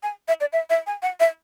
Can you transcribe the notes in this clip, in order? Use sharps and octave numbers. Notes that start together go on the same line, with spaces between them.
G#5
E5
D5
E5
E5
G#5
F#5
E5